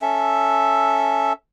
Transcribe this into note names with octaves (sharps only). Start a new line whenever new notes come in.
C#4 A4 E5